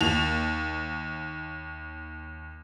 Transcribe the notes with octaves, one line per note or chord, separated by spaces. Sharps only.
D#2 F7